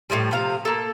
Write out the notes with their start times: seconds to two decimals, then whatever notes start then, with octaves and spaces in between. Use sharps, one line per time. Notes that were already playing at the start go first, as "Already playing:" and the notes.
0.10 A2 C3 F3 G3
0.31 C3 F3 F5 A#5
0.65 A#3 A4